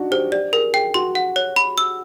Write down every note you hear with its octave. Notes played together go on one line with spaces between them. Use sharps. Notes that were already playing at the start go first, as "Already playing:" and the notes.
Already playing: D4 D#4 F#4
G4 C5
G4 D5
G#4 A#4
G#4 G5
F#4 C6
F#5
C#5
B5
E6